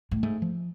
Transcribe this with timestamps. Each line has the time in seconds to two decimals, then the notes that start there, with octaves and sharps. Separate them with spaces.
0.11 A2
0.23 G#2 A3
0.42 F3